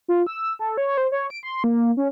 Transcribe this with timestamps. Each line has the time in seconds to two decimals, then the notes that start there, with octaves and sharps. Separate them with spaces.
0.08 F4
0.27 E6
0.59 A4
0.77 C#5
0.98 C5
1.12 C#5
1.30 D7
1.43 C6
1.64 A#3
1.97 C#4